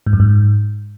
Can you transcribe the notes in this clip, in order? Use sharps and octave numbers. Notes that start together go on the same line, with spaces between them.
G#2
F#2
G#2